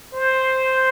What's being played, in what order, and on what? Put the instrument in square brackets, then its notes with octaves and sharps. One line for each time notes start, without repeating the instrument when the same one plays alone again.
[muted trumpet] C5